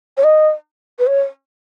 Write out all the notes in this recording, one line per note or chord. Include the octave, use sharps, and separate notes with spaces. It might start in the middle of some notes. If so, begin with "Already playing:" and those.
C#5
D#5
B4
C#5